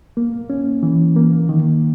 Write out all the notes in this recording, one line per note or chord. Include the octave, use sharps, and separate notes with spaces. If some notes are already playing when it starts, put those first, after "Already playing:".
A#3
C#4
E3
A#3
D#3